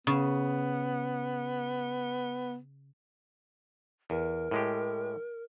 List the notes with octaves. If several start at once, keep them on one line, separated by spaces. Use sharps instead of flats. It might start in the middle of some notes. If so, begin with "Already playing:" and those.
C#3 B3
E2 A#4
A2 G#3 G4